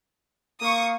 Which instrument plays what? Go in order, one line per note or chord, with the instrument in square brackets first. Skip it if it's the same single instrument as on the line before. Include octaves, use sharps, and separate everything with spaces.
[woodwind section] A#3 F5 [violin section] C#6 D#6